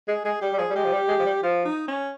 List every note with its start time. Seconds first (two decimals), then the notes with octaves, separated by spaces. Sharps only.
0.08 G#3 G#4
0.25 G#3 G#4
0.42 G3 G4
0.53 G3
0.59 F3 G#4
0.70 G3
0.75 G#3 G4
0.84 F3
0.92 G3
1.09 G#3
1.19 F3
1.25 G3
1.43 F3 F4
1.65 D#4
1.88 C#4